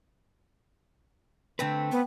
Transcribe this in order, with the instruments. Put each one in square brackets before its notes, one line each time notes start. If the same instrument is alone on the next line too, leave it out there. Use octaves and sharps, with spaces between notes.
[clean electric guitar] D3 B4 [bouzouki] A3 C4
[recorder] B3